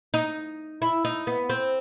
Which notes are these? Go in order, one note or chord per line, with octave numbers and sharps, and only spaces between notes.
D#4
E4
D#4
B3
C4